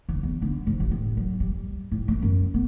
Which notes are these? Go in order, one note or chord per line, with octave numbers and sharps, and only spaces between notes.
D2
E2
D3
G#2
A1
A2
F#3
G3
A2
A#3
F#2
B3